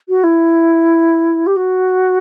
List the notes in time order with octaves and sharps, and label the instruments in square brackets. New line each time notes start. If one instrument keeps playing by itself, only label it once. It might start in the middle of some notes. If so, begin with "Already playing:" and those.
[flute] F#4
E4
G4
F#4